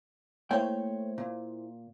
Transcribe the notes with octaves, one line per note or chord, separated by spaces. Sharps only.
A3 A#3 E4 C5 C#5 G5
A#2